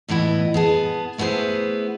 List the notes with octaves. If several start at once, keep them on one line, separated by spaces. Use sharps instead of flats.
E2 A2 B3 E4 D#5
B3 G#4 A5
A3 B3 E4 G#4 C5